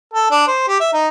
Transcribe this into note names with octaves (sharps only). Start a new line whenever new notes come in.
A4
D4
C5
G4
E5
D#4